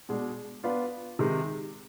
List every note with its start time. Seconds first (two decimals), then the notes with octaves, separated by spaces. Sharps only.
0.09 B2 G#3 D4
0.64 B3 D4 F4 B4
1.19 C3 D#3 G#3